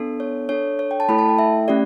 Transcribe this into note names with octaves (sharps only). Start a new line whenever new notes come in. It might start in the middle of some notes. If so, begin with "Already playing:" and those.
Already playing: B3 D4 A4
C#5
D4 A4 C#5
C#5
G5
A5
A3 E4 A4 B5
A5
G5
E5
A3 C#4 G4 D5